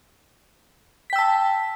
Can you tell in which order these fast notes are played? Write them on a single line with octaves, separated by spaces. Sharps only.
B6 G5 E6 A5